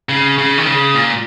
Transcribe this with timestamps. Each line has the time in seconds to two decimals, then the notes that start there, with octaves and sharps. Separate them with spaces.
0.09 C#3
0.38 C#3
0.58 D#3
0.67 C#3
0.95 A#2